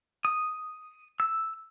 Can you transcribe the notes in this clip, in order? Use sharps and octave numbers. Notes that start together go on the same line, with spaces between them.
D#6
E6